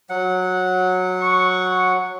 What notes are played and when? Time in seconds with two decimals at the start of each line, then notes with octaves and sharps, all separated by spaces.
0.10 F#3 F#5
1.22 C#6